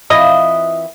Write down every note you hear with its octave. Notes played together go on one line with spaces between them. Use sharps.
E3 C4 E4 F4 D#5